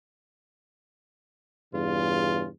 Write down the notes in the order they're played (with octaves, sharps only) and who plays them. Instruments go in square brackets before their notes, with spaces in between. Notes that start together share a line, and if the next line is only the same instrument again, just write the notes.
[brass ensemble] E2 G2 C#3 F4